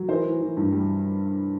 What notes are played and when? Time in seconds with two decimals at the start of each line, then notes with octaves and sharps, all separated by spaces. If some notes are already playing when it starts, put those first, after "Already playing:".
Already playing: F#3
0.08 E3 A#4 C5
0.25 E3
0.41 E3
0.57 G2
0.72 G3